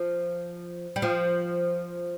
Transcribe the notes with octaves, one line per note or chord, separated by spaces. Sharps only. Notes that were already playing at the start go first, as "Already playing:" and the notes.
Already playing: F3
G3
F3